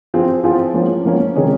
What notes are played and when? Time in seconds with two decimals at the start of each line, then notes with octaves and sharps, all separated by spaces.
0.14 F3 C4 F4 G#4
0.44 F3 C4 F4 G#4
0.74 F3 A#3 C#4
1.05 F3 A#3 C#4
1.35 C3 D#3 G#3 C#4 G#4